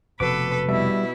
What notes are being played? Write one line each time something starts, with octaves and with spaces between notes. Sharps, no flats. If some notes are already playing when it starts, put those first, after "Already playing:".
F1 B2 A4 B4 D6
B2 G3 E4 E5